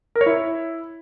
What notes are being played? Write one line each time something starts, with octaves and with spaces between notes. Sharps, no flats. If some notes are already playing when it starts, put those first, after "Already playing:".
A#4
C#5
E4